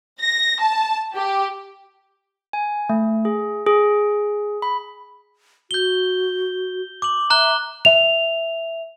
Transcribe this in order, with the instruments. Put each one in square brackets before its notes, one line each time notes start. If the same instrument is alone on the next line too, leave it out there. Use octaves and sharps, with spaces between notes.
[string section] A#6
A5
G4
[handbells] G#5
A3
G#4
G#4
B5
[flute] F#4 [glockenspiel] G6 G7
[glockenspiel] D6 F#7
[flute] E5 [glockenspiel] A#5 F#6 G7
[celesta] E5 F7